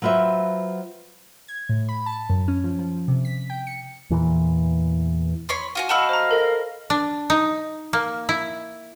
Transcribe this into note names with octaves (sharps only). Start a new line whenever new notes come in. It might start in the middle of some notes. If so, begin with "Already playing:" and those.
F#3 F4 B4 C5 E5
G#6
A2
B5
A5
F#2
C#4
F3
F3
C3
B6
G5
C#7
E2 A#2 E3
C#5 B5 C6
F4 F#4 G#5
A3 F#4 D#5 F5 A5 B5 E6 F6
C5 A#5
A4 A#4
D4
D#4
A#3
E4